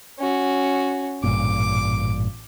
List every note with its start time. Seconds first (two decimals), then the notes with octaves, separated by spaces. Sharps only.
0.19 C#4 F#4
1.23 A1 G2 A#2 D6